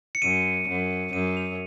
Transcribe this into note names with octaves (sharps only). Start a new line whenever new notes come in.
C#7
F#2 D#7
F#2
F#2 D#7
F7